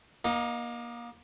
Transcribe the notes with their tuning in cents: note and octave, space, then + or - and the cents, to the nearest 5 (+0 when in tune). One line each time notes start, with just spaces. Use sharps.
A#3 +30 D#4 +0